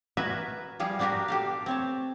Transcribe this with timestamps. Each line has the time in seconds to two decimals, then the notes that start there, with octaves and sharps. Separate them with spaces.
0.17 F#4 A#4 B4 E5 G#5
0.80 F3 G3 G#4 F5
0.99 B3 D4 F#4 G4 A#4
1.28 G4 A4 F5
1.66 C4 C#5 A5